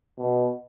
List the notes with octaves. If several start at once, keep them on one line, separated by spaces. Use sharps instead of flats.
B2